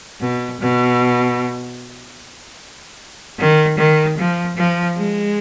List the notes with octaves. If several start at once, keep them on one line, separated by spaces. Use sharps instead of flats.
B2
B2
D#3
D#3
F3
F3
G#3